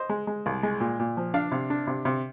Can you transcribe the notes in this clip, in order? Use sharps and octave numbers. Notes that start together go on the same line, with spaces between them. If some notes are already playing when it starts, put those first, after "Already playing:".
Already playing: C5 D#5
G#3
G#3
C2
G#3
A#2
A#2
F3
D4 D5 F5
C3
D4
C3
C3